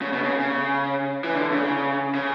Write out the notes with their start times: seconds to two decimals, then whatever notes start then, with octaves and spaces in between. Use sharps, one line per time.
0.02 C#3
0.13 B2
0.24 C#3
0.39 C#3
1.24 E3
1.34 D3
1.51 C#3
2.15 C#3